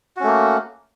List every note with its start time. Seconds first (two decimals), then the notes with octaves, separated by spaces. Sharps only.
0.17 F#4
0.20 C#4
0.23 A3
0.27 A#3